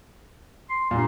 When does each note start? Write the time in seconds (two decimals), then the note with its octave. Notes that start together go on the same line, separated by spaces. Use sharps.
0.70 C6
0.91 G2 A#2